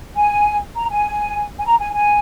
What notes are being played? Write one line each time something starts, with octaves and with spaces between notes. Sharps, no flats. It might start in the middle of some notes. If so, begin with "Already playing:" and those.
G#5
A#5
G#5
G#5
A#5
G#5
G#5